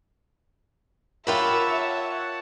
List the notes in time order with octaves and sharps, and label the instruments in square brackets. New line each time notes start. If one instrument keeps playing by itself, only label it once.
[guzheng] F4 G4 B5 [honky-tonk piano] A#4 [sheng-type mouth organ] C#5 F#5 A5 [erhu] E5